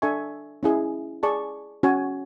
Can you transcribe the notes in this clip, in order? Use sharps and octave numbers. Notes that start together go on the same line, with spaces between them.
D4 A4 E5 G#5 C#6
C#4 E4 G#4
G#4 D5 A5 C#6
C#4 F#4 C#5 G#5